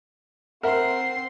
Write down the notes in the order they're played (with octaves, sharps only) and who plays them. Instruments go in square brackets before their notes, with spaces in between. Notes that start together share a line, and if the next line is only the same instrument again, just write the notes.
[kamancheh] C4 C6 [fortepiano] A#4 E5 F#5